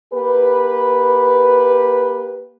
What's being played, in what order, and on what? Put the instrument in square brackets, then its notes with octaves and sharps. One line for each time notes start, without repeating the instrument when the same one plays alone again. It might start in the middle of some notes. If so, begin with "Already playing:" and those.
[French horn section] A#3 G4 B4